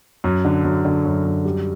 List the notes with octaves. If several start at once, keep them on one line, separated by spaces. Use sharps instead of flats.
F#2
D3
F#2
D3
F#2
F#2
G3